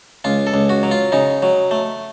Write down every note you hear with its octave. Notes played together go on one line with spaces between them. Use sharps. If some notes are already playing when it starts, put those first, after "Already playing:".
C#2 F4
A4
C#2
F#4
F#3
F4
C#3 D#4
F#3
A3